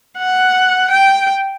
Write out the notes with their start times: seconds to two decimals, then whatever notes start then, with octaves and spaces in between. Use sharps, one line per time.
0.17 F#5
0.91 G5